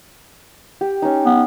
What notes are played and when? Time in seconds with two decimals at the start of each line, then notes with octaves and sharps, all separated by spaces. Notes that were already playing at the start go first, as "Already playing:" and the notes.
0.81 G4
1.02 C#4 D#4
1.26 B3